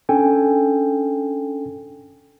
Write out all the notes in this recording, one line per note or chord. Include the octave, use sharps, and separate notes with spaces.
C#4 D4 A4 G5 G#5